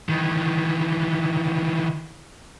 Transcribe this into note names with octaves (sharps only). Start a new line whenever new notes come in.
D#3 E3